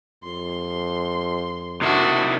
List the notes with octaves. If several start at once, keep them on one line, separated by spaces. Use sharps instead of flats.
F2 C6
C3 D#3 D4 E4 F#4